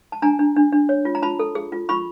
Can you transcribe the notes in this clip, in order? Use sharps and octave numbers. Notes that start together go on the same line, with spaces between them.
A5
D4 G#5 A#5
D4
D4
D4
C#5
F4
A#5
F4 A5 B5
A4
G#4
F4
F4 B5 C#6